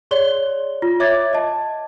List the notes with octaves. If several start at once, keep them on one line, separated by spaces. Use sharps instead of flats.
G#4 C#5 D5 C6 G7
F4
C#5 E5 D6 G#6 A6
D#5 A5